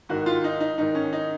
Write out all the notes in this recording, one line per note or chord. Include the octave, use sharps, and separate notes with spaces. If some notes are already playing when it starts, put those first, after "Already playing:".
G#2 D#3 F#4
F4
D#4
D#4
G#2 D#3 D#4
C#4
D#4